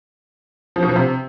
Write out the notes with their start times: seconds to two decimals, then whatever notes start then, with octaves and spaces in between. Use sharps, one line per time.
0.76 F3
0.83 B2
0.89 F3
0.96 C3